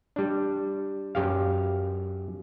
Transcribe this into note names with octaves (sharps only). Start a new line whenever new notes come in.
G3 D4
F#2 G4 F5